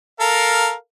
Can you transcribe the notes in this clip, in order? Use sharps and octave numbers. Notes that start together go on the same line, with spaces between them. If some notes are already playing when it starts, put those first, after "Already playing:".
A4 A#4 F5